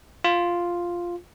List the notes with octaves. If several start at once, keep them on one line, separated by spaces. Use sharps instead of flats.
F4